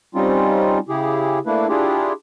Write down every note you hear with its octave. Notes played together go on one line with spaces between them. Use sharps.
G3 C4 C#4 D#4 F4
C#3 E4 G4 G#4
A3 A#3 D4 E4 B4
D4 E4 F4 G4 G#4